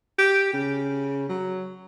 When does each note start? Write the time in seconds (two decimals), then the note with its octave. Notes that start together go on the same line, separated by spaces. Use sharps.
0.18 G4
0.53 C#3
1.29 F#3